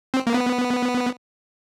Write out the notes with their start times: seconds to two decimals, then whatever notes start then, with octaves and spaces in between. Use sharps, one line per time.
0.14 C4
0.27 A#3
0.34 B3